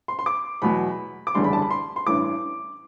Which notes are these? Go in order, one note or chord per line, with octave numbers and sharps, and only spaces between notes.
C6
C6
D6
E2 B2 F#3 B5
D6
F#1 E2 D3 G3 C6
B5
A5
B5
C6
C6
A1 G2 E3 D6